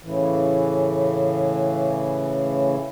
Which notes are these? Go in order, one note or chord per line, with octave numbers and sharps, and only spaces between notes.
A2 C#3 E3